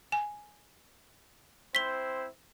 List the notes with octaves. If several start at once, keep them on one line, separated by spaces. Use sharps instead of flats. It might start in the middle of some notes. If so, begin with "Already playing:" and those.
G#5
C4 E4 C5 B6 G7